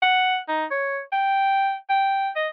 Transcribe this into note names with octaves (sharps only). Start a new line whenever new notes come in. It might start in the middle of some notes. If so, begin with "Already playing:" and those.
F#5
D#4
C#5
G5
G5
D#5